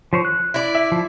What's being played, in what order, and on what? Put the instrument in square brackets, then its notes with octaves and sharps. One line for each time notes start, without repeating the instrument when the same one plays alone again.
[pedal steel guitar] F3 C5 C#5
F#6
[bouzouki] E4 D5
[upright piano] E5
[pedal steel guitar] F3